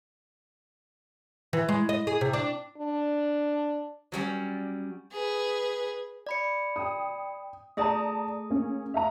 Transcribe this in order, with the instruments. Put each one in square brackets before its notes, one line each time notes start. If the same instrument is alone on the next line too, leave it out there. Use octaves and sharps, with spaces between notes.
[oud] E3
G#3
D#5
G#4
C3
D4
[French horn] D4
[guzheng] F#3 G3 C#4 D5
[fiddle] G#4 B4
[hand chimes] D5 B5 C#7
[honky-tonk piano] G5 D#6
[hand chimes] A3 G#4 D#6 [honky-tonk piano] D5 A5 A#5
[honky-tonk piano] A#3 C#4
E5 F5 A#5